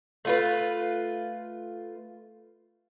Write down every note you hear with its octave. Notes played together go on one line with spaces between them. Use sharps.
A3 F4 B4